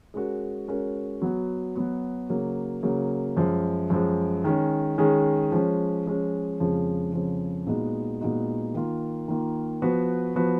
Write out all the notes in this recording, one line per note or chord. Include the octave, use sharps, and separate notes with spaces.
G#3 C#4 F#4 A#4
G#3 C#4 F#4 A#4
F#3 B3 F#4
F#3 B3 F#4
C#3 F#3 A#3
C#3 F#3 A#3
F#2 F3 G#3
F#2 F3 G#3
D#3 G#3 C#4 G#4
D#3 G#3 C#4 G#4
F3 G#3 C#4
F3 G#3 C#4
F2 C#3 F3 G#3
F2 C#3 F3 G#3
A#2 G#3 B3 D#4 F#4
A#2 G#3 B3 D#4 F#4
D#3 A#3 F4
D#3 A#3 F4
F3 B3 F#4 B4
F3 B3 F#4 B4